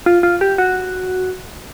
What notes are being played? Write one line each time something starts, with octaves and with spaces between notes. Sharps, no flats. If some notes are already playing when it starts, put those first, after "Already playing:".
F4
F4
G4
F#4